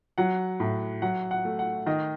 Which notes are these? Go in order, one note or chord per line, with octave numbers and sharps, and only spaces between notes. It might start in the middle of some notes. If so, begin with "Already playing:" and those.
F#3 F#5
A2
F#3 F#5
F#5
A3
F#5
D#3 D#5